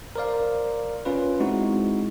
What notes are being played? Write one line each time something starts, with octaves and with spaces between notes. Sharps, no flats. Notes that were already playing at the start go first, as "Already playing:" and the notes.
A#4 C5 D5 F5
C#4 F4 B4
G#3 C4 D#4 E4 F#4